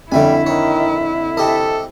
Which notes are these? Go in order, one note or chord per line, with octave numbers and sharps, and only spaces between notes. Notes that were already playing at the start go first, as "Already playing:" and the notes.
F2 D3 G3 A3 E4 E5 G#5
D#3 C#5
C3 G4 A4 D#5